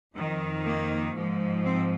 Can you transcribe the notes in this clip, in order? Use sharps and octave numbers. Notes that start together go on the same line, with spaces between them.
F2 D#3
A#3
G#2 F3
C4